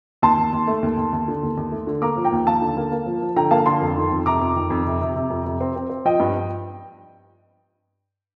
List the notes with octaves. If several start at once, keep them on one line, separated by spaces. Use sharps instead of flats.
D#2 A5 C6
D#2
D#2
A3
D#2
D#2
D#2
D3
D#2
D#2
A3
D3
A#3 A#5 D6
F3
G5 A#5
D#2
D#2 F5 A5
D3
A#3
A#3
F3
F3
D3 G5 A#5
A#3 F5 A5
D3 A5 C6
F2
D#3
F2
C3 A#5 D6
F2
D#3
F2
C3
C3
C3
F2
C3
C4
C4
C4
F3 D#5 G5
G2